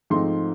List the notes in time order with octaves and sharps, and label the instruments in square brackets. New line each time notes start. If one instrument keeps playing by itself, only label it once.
[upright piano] G#2 F3 A3 C4 D#4 C6